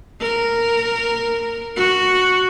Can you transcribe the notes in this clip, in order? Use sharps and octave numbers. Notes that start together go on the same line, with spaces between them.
A#4
F#4